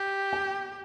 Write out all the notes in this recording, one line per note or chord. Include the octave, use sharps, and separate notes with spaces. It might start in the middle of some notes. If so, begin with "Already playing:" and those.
Already playing: G4
G5